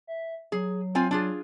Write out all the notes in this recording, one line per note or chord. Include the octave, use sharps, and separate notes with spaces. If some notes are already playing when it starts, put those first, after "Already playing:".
E5
F#3 G#4
C4 F4 G#5
D4 F4 G#4